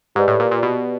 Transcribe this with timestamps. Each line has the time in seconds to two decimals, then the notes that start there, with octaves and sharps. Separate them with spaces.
0.15 G#2 G4 B4 D5
0.28 A2
0.40 A#2
0.51 A#2
0.63 B2